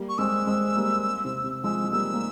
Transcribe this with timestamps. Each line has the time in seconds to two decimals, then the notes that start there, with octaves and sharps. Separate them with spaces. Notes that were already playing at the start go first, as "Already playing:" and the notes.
Already playing: G3 A#3
0.09 C#6
0.18 G#3 C4 E6
0.47 G#3 C4
0.76 G3 A#3
1.25 C3
1.44 C3
1.63 F3 G#3 E6
1.84 G#3
1.92 G3 A#3 E6
2.13 A#3